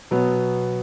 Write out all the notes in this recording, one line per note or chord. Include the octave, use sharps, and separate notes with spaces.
B2 F#3 B3